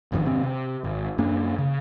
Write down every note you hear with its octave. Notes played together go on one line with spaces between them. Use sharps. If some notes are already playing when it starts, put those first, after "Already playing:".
G#1 F2 B2 D#3
G#1 C3 C4
C3
G#1
F#2 A#3 D4
C#3